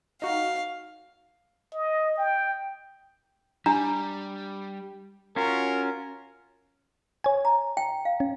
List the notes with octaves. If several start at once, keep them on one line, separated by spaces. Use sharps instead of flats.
D#4 F#4 F5
D#5
G5
G3 D4 A#5
C#4 F4 F#4 A#4
C#5 G#5
A#5
G5
F5
C#4